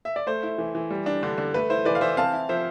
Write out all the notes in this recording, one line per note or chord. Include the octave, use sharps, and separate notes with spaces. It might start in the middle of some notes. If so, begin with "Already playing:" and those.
E5
D5
A3 C5
E4
E3
E3
G3
D4
D3
D3
A3 B4
E4 C5
E3 B4 D5
F5
E3 C5 E5
C4 F5 A5
E4
F3 C5 E5